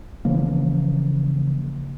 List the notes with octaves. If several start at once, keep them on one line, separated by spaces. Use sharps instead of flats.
C#3 E3 F3 A#3